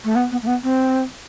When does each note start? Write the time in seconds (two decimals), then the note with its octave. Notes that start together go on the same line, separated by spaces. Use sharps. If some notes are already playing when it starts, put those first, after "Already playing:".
0.04 A3
0.15 B3
0.31 B3
0.42 A3
0.47 B3
0.63 C4